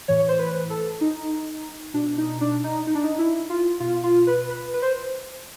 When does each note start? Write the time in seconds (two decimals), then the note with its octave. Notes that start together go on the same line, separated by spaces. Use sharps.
0.08 A2 E3 C#5
0.29 C5
0.39 B4
0.70 A4
1.01 D#4
1.94 B2 D4
2.18 D#4
2.41 D4
2.64 D#4
2.87 D#4
2.95 D4
3.03 D#4
3.18 E4
3.50 F4
3.80 B2 F4
4.04 F4
4.27 B4
4.50 B4
4.74 B4
4.82 C5